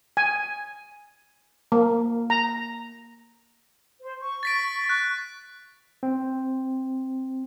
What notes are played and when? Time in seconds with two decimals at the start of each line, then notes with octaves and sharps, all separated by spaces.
0.17 G#5
1.72 A#3
2.30 A#5
4.01 C5
4.20 C#6
4.43 A6 B6 D7
4.89 F#6
6.03 C4